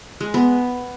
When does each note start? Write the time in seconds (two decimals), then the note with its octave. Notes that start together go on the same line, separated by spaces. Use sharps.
0.21 G#3
0.34 B3